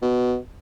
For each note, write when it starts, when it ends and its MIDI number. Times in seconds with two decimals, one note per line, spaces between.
0.02 0.37 47